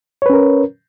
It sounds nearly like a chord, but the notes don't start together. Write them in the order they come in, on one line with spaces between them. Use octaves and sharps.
C#5 B4 C#4 A#4